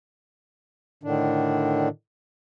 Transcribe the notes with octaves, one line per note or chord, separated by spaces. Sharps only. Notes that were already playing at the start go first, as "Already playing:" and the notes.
A2 D3 D#3 D4